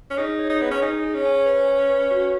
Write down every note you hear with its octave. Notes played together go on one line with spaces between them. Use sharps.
C#4
D#4 G#4
C#5
D#4
B3 G#4
C#4
D#4 G#5
G#4
C#4
G#5
B4
G#5
B4
F#4